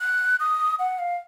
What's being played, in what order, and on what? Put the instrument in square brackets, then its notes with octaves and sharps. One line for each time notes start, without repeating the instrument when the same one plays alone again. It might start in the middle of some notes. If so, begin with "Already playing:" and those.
[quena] F#6
D#6
F#5
F5